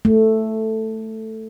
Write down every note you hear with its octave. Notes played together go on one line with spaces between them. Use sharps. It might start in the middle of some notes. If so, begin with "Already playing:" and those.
A3